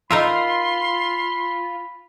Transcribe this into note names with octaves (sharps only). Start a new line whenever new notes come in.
D#4 F4 A#4 E5 B5 C6